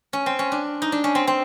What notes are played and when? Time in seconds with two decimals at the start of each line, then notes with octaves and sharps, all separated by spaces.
0.13 C#4
0.26 C4
0.39 C#4
0.52 D4
0.82 D#4
0.92 D4
1.04 C#4
1.15 C4
1.27 C4